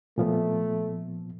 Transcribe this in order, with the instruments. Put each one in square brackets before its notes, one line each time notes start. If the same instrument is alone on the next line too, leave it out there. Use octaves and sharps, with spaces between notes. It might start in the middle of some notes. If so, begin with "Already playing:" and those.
[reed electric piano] A#2 F3 B3 [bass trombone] A3